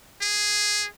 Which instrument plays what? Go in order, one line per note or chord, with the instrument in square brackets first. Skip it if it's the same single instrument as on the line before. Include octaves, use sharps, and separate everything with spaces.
[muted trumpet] G#4